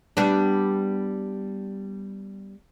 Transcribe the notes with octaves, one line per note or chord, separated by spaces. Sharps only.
G3 B3 D4